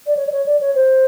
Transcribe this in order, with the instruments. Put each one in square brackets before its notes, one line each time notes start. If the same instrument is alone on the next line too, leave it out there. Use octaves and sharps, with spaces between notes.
[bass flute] D5
C#5
D5
C#5
D5
C#5
C5